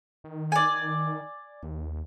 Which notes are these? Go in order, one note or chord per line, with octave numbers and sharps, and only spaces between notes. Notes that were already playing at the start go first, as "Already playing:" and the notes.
D#3
D5 G#5
D#2